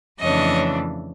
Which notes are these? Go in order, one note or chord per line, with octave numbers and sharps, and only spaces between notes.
F2 C#3 E3 A3 D4 C#5 D#5